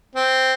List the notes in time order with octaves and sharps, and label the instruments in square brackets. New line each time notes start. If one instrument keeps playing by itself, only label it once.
[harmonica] C4